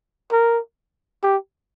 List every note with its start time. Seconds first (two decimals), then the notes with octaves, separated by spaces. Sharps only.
0.31 A#4
1.23 G4